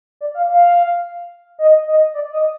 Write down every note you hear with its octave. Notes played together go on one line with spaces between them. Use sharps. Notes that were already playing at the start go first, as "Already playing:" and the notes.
D5
F5
F5
D#5
D#5
D5
D#5